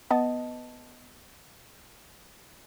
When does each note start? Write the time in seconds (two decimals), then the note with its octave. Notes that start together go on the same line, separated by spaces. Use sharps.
0.11 B3 D#5 A5